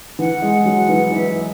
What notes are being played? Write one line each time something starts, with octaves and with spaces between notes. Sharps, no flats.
E3 F#5
G#3
F#3
E3
E3 E5